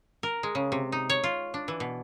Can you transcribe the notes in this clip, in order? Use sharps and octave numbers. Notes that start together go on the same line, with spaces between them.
A#4
G#3
C#3
C3
D#4
C#5
F4
D4
E3
B2